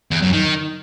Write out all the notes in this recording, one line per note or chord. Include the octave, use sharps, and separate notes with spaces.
E2
F#2
D#3